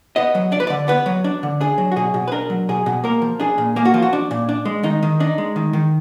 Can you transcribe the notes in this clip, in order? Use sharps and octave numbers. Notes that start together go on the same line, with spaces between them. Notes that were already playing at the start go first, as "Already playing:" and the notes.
B3 D#5
F#3
D4 D5
B4
D3 D5
B3 B4
F#3
D4
D3
D4 G#4
F#3
F#4
B2 G#4
B2
B4
D4 A#4
F#3
B2 G#4
B2
A#3 A#4
F3
D4 G#4
A#2
A#3 G#4
F#4
F3 F4
F#4
D4
A#2
D4
G#3
D#3 D#4
D#3
D4 D#4
G#3
D#3
D#3